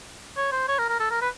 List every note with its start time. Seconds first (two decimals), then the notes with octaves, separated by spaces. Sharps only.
0.37 C#5
0.52 C5
0.68 C#5
0.79 A#4
0.89 A#4
1.00 A4
1.11 A#4
1.21 B4